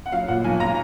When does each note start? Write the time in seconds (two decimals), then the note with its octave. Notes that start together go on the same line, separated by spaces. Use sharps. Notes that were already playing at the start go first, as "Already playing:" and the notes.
0.06 F#5
0.12 F#3 F5
0.28 A#2 F#5
0.44 B1 G#5
0.60 A#5